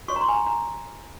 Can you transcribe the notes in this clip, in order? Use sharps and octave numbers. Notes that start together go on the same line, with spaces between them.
F#4 C#5 C#6
A#5
C6
G#5
A#5
A#5